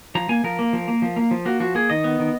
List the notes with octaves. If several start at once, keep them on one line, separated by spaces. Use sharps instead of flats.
F3 A#5
A#3 G#5
F3 A#4
A#3
F3
A#3
F3
A#3
F3
A#3 F#4
F3 F#4
A#3 G#4
D#3 D#5
B3
D#3